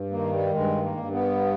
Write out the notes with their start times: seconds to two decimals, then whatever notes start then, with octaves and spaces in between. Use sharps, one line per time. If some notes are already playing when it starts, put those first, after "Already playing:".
Already playing: G2
0.11 D#3 A#3
0.32 G3
0.54 G2 G#3
0.83 A#3
0.97 G2
1.12 B3